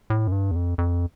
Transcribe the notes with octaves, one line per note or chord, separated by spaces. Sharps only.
A2
F#2
G2
E2
F2
F2